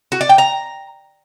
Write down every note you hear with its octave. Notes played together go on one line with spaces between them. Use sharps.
F#4
D5
G5
A#5